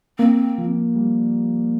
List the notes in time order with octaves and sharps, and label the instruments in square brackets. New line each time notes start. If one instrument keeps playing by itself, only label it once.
[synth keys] A#3 [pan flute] C4
[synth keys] F3
G3